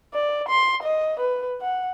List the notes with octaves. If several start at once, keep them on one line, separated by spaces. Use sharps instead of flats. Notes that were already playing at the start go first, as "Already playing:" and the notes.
D5
C6
D#5
B4
F#5